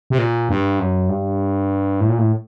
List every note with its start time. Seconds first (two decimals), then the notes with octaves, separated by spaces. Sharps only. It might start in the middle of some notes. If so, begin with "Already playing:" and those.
0.10 C3
0.18 A#2
0.49 G2
0.79 F#2
1.09 G2
2.01 A2
2.09 A#2
2.18 A2